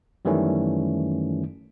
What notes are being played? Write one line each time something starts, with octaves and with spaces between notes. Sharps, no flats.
F#2 D#3 E3 G3 A3 C#4